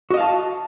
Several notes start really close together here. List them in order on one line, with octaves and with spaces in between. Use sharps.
F#4 D#5 F5 A5